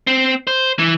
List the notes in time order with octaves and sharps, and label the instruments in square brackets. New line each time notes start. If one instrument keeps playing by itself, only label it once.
[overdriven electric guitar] C4
C5
E3